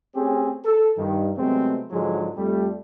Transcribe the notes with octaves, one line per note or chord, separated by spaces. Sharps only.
A3 C4 C#4 G4 G#4
A4
G2 D#3
C3 F#3 G#3 A3 B3 C4
G#2 D3 F3 F#3 G#3
F2 G3 A3